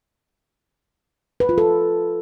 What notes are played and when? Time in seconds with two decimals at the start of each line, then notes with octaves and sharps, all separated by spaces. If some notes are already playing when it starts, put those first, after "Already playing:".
1.40 B4
1.49 F4
1.58 A4